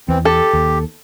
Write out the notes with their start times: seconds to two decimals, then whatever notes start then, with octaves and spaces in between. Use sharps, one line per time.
0.09 E2 E3 C4
0.25 G4 A4
0.53 D#2